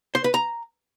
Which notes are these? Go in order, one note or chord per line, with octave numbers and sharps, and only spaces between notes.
C5
B4
A#5